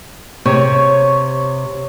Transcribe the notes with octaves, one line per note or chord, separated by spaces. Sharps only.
C3 C#5